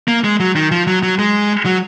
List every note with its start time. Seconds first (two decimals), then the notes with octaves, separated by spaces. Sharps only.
0.08 A#3
0.24 G#3
0.40 F#3
0.56 D#3
0.71 F3
0.87 F#3
1.03 F#3
1.19 G#3
1.65 F#3